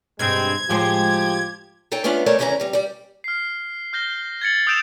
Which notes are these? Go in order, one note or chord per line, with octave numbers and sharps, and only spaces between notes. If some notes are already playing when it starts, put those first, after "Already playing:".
G2 B2 G3 G#3 C4 G#6
A2 F3 G#3 G4 C5
D#4 A4 C#5 G5
A3 B3 C#4 D4 F4
G#3 A3 A4 A#4 C#5 D5
E2 C#3 E3 C#4 A#4 A#5
C3 G3
G3 D5
F6 C7
F6 G6 A#6 G7
G#6 A6 C#7 F#7
D#6 E6 G6 D7 E7 F7